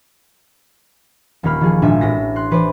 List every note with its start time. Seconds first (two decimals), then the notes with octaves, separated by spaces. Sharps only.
1.43 D#1 D#3 A#3 B5 F6
1.61 D#3 F3 G#4
1.82 G#1 A#2 D4 E5 G#5
2.01 A1 A2 E6 A#6 B6
2.36 C6 F#6
2.51 E3 B4 C5 D5